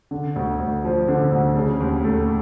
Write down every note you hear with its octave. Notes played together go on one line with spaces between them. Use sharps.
D3
D2
D2
F3
D3
D2
C#3
D#2
A3